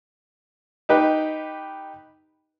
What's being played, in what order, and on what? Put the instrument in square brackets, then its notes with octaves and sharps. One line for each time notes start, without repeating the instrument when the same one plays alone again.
[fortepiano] D#4 G4 B4